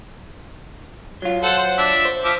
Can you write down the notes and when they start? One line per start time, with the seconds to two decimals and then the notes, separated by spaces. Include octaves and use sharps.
1.22 F#3 F4
1.43 A4 C5 F#5
1.58 C5 F#5
1.78 D4 E5
2.05 C5
2.24 F3 E5 D6